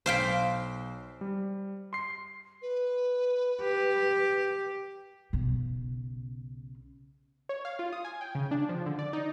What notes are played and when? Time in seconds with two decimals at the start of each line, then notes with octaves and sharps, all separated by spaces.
0.06 B1 C5 F5 G5 B6
1.21 G3
1.93 C6 C7
2.62 B4
3.62 G4
5.33 B1 C#3
7.49 C#5
7.65 F5
7.79 F4
7.93 D#6
8.05 G#5
8.21 G5
8.35 C#3
8.51 D4
8.69 F3
8.86 D3
8.99 D5
9.13 D#4